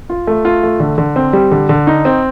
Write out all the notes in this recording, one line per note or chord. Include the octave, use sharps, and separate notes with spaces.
F4
A3
F4
A3
D3
D3
C4
G3
D3
D3
D#4
C4